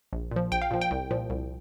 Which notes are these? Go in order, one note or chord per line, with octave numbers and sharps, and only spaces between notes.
A#1
A#2 F3
A#1 G5
F5
A#2 F3
G5
C2
A#2 F3
C2